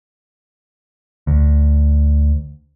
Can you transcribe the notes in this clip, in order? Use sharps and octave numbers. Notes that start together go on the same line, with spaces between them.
D2